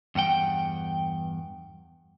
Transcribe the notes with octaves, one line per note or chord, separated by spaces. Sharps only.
E2 G2 F#5 G5